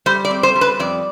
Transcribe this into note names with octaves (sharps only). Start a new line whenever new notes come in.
G3 C5
D5
C4
C5
G3
B4
F2 D5